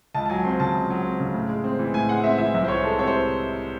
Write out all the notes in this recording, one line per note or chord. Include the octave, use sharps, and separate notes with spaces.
C#2 A5
A5
F#3 G#5
C4 C6
C#3 A5
C#2
F#3
C4
C#3
A2
G#3
C4
E3
A2 G#5
G#3 F#5
C4 E5
E3 E5
C2 E5
C5
E3 C#5
G#3 A4
C3 C#5
C5